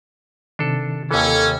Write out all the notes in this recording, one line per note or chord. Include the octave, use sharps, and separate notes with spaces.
C3 D#3 D4 A4
D#2 E3 C#4 A4